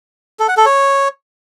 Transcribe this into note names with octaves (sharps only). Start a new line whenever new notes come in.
A4
F#5
A4
C#5